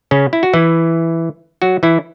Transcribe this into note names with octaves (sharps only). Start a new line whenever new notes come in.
C#3 C#4
E4
F#4
E3 E4
F#3 F#4
E3 E4